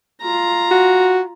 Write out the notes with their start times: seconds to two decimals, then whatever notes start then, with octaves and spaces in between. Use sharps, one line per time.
0.22 F4 A#5
0.71 F#4